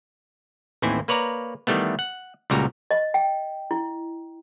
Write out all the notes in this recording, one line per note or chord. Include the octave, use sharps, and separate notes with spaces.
A1 D#2 E3 C4 E4 G#5
A#3 B4 C#5 D5 A#5
D#3 E3 G3 A3 B3
F#5
C#2 A#2 C#3 G3 F#4 A#5
D#5
G5
E4